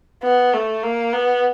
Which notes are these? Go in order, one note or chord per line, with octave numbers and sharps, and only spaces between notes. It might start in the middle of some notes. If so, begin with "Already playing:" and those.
B3
A3
A#3
B3